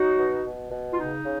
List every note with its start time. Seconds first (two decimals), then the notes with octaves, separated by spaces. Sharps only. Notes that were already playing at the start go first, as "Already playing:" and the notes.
Already playing: F#3 D#4 F#4
0.17 B2
0.43 B2
0.71 B2
0.94 F4
0.98 C#3 D#4
1.25 C#3